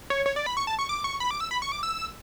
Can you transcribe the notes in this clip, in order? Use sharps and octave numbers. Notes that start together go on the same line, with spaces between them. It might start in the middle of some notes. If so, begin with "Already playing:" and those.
C#5
C#5
D5
B5
C#6
A5
C#6
D6
C#6
B5
D6
E6
B5
C#6
D6
E6